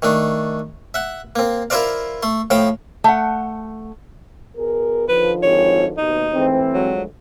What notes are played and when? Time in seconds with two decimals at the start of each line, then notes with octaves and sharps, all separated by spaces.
0.02 D#3 A3 D4
0.94 E5 F#5
1.36 A#3 C4
1.70 E4 F4 A#4 C5 D5 F5
2.23 A3 C6
2.50 A2 F3 C5 F5 G5
3.04 A3 F#5
4.57 B2 G#4 A#4
5.09 D3 D#3 F3 B4
5.43 G#1 C#5
5.98 D#2 B2 D#4
6.32 G#2 E3 A3 C4
6.74 D2 F3 F#3 G#3